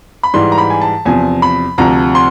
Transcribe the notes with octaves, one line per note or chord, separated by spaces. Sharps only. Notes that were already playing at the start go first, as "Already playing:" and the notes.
B5
G#2 E3 G3 C6
A#5
B5
G#5
A5
E2 C3 F3 G#5
B5
D2 C3 F3 A#5
C6